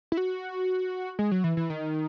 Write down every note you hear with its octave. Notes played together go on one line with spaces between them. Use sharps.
E4
F#4
G#3
F#3
E3
E3
D#3